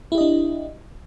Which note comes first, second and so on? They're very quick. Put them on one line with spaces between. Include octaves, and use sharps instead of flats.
E4 G4 D#5 D4